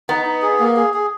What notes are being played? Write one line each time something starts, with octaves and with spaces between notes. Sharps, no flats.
B3 D#4
D#4
G#4
A#3
G#4
G#4